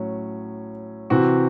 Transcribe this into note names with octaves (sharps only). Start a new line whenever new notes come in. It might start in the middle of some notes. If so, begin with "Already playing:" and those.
Already playing: A2 F#3 C#4
C3 E3 C4 F#4